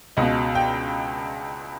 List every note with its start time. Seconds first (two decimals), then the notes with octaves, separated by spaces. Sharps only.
0.17 C#2 B2 D#5
0.55 G5